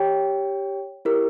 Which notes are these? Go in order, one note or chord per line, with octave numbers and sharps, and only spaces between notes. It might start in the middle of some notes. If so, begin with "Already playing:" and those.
Already playing: G4 C#5 G5
E4 G4 A#4